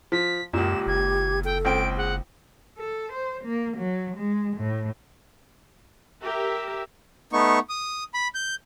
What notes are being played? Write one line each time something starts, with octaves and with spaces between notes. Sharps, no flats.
F3 B6
C#2 F#2 A#2 G4 E7
F#1 G#6
A4 G5
C#2 C4 G5 D7
G#4 F#5
A4
C5
A#3
F#3
G#3
A2
G4 A#4 E5
A3 B3 D#4 C#6
D#6
B5
G6